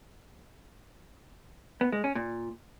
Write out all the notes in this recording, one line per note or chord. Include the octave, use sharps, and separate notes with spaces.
B3
G#3
C#4
A#2